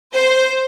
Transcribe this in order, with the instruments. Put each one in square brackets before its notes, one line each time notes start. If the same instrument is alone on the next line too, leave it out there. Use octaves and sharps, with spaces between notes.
[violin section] C5